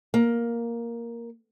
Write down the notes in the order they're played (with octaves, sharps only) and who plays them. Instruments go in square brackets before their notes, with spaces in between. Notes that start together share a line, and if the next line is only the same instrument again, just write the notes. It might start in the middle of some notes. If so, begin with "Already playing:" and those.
[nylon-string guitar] A#3